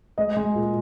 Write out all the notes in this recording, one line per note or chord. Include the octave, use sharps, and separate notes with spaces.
G#3 D#5
G#3
A#2